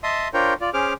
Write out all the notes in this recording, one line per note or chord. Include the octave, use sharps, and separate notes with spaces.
D#5 E5 A5 C6 D#6
D4 F4 A#4 C5 C#5 G5
F4 D5
C#4 G#4 C5 D6 F6